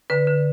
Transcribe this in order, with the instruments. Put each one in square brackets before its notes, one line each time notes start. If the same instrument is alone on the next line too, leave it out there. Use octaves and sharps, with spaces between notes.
[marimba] D3 B4
D3